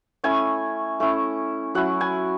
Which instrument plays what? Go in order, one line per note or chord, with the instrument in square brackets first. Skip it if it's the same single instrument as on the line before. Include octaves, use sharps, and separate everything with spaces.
[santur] A3 C#4 E4 G#5
A3 C#4 E4
F#3 C#4 E4 F#5
G#5